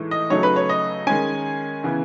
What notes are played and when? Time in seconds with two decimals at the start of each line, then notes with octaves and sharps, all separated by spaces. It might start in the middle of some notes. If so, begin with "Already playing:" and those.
Already playing: A2 E3 G#3 D#4
0.11 D#5
0.30 C#3 F#3 A3 D#4 C#5
0.43 B4
0.56 C#5
0.69 D#5
1.07 D#3 G#3 C#4 G#5
1.84 C#3 E3 B3